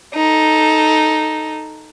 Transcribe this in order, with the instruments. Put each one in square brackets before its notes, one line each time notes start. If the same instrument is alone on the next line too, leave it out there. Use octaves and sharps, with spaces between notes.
[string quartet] D#4 A4